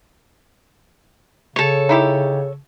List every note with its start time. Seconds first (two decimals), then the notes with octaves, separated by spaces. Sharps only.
1.56 C#3 A4 C#5
1.89 D#4 E4 G4